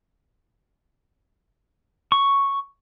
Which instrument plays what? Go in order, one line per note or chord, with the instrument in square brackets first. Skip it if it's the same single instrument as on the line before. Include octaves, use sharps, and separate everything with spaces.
[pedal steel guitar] C#6